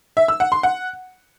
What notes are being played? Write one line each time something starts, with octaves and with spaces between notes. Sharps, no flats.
E5
E6
F#5
C6
F#5